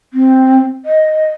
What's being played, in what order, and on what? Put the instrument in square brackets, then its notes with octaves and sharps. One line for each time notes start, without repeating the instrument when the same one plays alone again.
[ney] C4
D#5